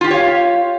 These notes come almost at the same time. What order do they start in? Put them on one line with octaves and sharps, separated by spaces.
F4 G4 G5 C#5 F5